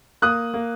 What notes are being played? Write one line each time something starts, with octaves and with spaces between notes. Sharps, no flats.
A#3 D#6 F#6
A#3